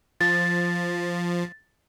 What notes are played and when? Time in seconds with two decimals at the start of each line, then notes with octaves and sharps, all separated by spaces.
0.21 F3 A6